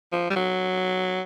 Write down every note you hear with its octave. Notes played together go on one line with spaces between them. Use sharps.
F3
G3
F#3